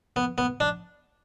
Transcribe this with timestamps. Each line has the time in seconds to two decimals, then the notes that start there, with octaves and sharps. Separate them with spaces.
0.16 B3
0.38 B3
0.60 D4